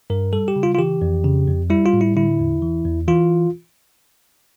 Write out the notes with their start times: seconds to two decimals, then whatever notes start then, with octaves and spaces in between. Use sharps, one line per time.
0.10 G2 A#4
0.33 G3 A4
0.48 G4
0.56 C#3
0.63 F4
0.75 F4
0.78 E3 G4
1.02 F2
1.25 C#3
1.47 F2
1.70 G3 E4
1.86 F4
1.93 A2
2.01 E4
2.16 D3 E4
2.39 E2
2.62 E3
2.85 E2
3.08 E3 F4